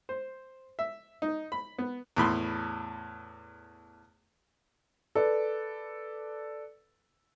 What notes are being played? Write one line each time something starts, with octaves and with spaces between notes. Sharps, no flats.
C5
E5
D#4
B5
B3
E2 A2 B5 C6
A4 B4 D5